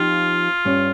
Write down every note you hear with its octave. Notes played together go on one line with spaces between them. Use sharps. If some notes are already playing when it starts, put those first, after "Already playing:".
Already playing: F3 C4 D#4 F4 G4
G2 G3 C#4